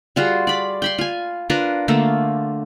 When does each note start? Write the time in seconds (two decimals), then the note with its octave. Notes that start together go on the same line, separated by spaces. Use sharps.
0.16 G3 F4 F#4 G#4
0.47 D5 B5
0.82 G5 B5 C6
0.98 F4 G#5
1.50 D4 F4 A#4 B4
1.88 D3 A3 A#3 F4